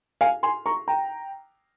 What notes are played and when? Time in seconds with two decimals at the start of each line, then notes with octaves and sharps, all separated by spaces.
0.21 F5 G#5
0.43 G#5 C6
0.66 A#5 C#6
0.88 G5 A#5